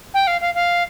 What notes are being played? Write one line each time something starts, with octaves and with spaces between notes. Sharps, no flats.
G5
F5
F5
F5